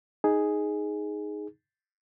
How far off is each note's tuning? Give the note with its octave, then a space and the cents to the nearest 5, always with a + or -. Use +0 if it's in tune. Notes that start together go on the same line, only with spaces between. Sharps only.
D#4 +0 G#4 +0